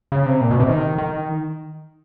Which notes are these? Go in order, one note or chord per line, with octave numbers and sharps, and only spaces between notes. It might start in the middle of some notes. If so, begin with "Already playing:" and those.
C#3
C3
A#2
B2
C3
D#3
D#3